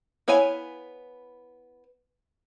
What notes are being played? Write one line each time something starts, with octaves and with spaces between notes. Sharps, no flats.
B3 E4 C#5 F5 G#5